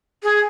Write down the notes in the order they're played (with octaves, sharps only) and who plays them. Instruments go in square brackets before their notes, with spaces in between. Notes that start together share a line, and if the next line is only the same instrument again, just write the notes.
[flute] G#4